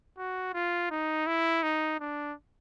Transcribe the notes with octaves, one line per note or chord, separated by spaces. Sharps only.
F#4
F4
D#4
E4
D#4
D4